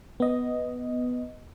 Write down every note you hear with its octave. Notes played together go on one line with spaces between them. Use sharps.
B3 D#5